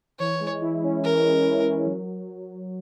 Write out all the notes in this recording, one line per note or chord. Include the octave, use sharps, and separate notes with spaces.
E3 C#5
G#3
E4
C#4
E3 A#4
G#3
E4
C#4
F#3